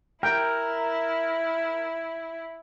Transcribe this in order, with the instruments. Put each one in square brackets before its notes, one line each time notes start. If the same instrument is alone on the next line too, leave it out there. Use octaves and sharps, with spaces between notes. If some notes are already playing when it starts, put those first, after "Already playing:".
[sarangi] E4 [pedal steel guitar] A#4 [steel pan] G5